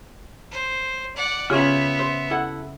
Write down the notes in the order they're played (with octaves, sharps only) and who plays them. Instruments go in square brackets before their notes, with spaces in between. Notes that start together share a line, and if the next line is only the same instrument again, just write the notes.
[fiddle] C5
D5 F#5
[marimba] C#3 C#4 [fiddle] B3 E5 [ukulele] F4 G#4
[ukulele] C5
E4 A4 F#5